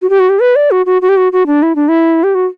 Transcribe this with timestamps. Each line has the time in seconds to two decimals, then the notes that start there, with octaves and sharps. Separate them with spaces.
0.02 F#4
0.10 G4
0.20 F#4
0.29 G4
0.40 B4
0.56 D5
0.71 F#4
0.86 F#4
1.02 F#4
1.09 G4
1.17 F#4
1.32 F#4
1.47 D4
1.63 E4
1.76 D4
1.88 E4
2.24 G4
2.35 F#4